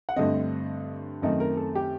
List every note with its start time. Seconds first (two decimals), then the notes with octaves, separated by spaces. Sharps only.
0.09 F#5
0.16 G2 D3 A3 C4 D#5
1.22 F#2 D#3 A3 C4 D#5
1.40 A#4
1.57 A4
1.75 G4